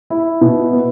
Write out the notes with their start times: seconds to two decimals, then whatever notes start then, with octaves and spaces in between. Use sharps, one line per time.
0.10 E4
0.41 B2
0.72 B3